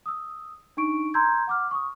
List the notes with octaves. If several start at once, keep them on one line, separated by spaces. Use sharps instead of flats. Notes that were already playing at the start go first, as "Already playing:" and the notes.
D#6 E6
D4 D#4 C#6 D7
A#5 C6 E6 G6 G#6
F#5 D6 F6
C#6 D#6